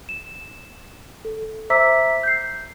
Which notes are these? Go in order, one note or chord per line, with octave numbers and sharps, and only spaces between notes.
E7
A4
C5 E5 A#5 D6 E6 B6
G6 C7